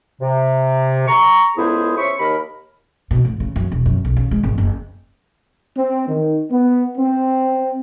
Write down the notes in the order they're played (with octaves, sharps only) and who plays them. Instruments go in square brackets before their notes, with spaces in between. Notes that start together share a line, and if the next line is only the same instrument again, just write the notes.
[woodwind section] C3
A#5 C#6
C#2 A2 B3 E4 G#4 C5
C#4 C5 E5 C#6
D#2 A#4 B5
[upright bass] B2
A2
C#3
F#2
E1
F#2
B1
C#3
G#3
G#1
F#1
[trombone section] C4
D#3
B3
C4